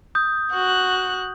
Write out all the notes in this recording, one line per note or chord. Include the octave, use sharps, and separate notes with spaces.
D#6 G6
F#4 F#6